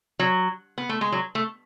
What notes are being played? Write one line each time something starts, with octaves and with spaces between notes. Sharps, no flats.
F#3
B3
A3
G#3
F#3
A3